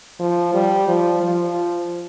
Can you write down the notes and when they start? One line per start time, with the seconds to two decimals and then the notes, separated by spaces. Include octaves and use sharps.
0.20 F3
0.54 G3
0.88 F3
1.23 F3